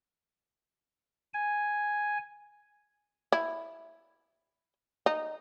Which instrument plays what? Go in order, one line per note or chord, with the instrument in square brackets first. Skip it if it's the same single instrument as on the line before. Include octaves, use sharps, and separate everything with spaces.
[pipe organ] G#5
[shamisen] E4
D#4